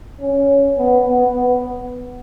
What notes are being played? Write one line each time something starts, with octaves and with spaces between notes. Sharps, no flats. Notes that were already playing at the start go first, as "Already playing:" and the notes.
C#4
B3
B3
B3